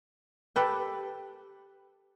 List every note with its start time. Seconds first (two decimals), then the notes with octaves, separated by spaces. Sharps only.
0.56 G4 A4 B4 G5